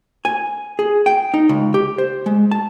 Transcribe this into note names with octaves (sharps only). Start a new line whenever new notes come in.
G#5
G#4
G5
D#4
C#2
G4
C5
G#3
A5